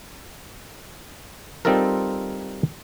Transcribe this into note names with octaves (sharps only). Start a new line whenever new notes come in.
G3 C4 D#4 F4 A4 A#4